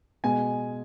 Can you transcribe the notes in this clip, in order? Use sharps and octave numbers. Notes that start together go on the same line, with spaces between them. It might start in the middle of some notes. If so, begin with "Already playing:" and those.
B2 G#3 G#5